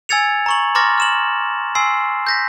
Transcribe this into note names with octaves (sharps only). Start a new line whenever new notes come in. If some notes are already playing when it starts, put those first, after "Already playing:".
G#5 E6 G#6 A6 C#7 F7
A#5 C#6 F#7
A#5 C6 D6 F6 A6 A#6
F6 E7 F#7
G#5 C6 E6 C7
G6 A#6 B6